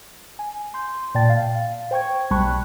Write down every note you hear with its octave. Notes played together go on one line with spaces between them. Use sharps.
G#5
C6 G6
A#2 D5 G5 A5 A6
F5
C5 G5 C#6 G#6
B1 G3 A5 B5 C#6 F#6